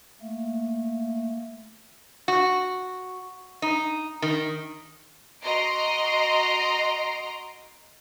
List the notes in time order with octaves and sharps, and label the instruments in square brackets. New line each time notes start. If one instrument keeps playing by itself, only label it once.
[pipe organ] A3 A#3
[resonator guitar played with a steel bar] F#4
D#4
D#3
[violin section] F#4 D#5 A#5 C6 C7 D7